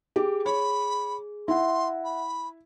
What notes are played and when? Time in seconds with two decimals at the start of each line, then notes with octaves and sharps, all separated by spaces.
0.16 G4 G#4
0.46 C#5 B5
1.48 E4 E5 F#5 C6
2.04 B5